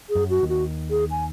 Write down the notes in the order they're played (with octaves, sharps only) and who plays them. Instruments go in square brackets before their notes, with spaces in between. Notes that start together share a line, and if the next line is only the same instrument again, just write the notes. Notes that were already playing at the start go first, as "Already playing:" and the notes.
[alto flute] G#4
[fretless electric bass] F#2 F#3
[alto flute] F#4
[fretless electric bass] D#2 D#3
[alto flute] F#4
G#4
G#5